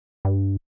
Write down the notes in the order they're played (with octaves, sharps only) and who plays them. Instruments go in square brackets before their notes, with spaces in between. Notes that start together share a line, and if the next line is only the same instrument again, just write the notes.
[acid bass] G2